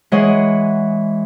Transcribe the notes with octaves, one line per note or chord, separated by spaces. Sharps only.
E3 G#3 G#4 C#5 D#5 F#5